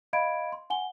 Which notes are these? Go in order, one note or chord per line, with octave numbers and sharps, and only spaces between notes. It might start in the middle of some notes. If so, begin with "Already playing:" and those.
D#5 F5 B5 G#6 D7
C6
F#5 G#5 G7